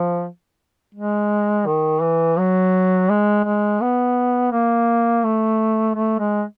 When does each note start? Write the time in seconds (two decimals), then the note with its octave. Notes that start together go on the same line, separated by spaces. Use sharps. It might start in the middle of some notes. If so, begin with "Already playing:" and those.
Already playing: F3
0.95 G#3
1.66 D#3
2.02 E3
2.38 F#3
3.10 G#3
3.44 G#3
3.81 B3
4.52 A#3
5.24 A3
5.95 A3
6.19 G#3